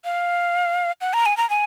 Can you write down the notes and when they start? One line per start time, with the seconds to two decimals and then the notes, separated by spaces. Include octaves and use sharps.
0.05 F5
1.01 F#5
1.13 A#5
1.26 G#5
1.37 A#5
1.50 G#5